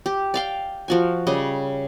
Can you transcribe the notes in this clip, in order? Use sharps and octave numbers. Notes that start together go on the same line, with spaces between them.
G4
D5 F5 G5
F3 F#4 G#5
C#3 G3 D#5